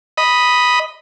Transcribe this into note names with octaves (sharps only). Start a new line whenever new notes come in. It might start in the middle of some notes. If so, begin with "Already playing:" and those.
D#5 B5